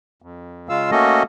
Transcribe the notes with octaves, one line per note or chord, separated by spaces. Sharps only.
F2
C#3 G#3 F4 F5 E6
A3 A#3 C#4 F#4 A4 D#5